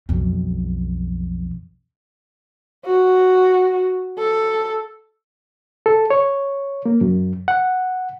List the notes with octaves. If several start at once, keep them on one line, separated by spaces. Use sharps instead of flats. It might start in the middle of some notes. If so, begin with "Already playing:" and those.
B1 F2
F#4
A4
A4
C#5
A#3
F#2
F#5